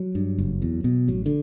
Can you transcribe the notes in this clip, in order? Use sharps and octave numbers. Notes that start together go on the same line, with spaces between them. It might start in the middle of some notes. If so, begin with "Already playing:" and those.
Already playing: F#3
G2
F#1
E2
B2
A1 F#3
D3